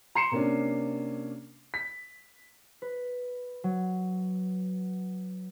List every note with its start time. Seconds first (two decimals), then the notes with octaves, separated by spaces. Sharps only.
0.15 A#5 C6 C7 C#7 E7
0.32 C3 A#3 C#4 D4
1.74 B6
2.82 B4
3.64 F#3